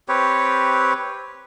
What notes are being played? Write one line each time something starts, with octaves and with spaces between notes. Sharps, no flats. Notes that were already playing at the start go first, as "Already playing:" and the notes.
C4 G4 B4 C#5